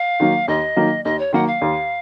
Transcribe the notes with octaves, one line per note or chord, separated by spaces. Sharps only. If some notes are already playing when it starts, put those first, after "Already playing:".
Already playing: F5
D#3 F#3 A#3
D#2 D#5
D#3 F#3 A#3
D#2 D#5
C#5
D#3 F#3 A#3 F#5
F5
D#2